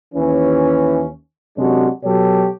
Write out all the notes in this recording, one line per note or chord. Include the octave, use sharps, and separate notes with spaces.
D#2 E3 C#4
F#2 C3 G#3 D4 F#4 C#5
B2 F#3 G4 A4 C#5